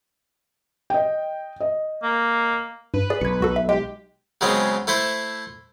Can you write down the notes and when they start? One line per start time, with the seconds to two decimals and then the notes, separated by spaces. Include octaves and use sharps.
0.90 D#5 G5
1.60 D#5
2.03 A#3
2.94 G2 B4
3.10 G#4 D5
3.21 B1 G#6 C#7
3.41 C#2 F#4 A4
3.56 E5
3.69 G#3 G4
4.41 C#3 F#3 G#3 B3 C4
4.87 A3 E4 A4 C5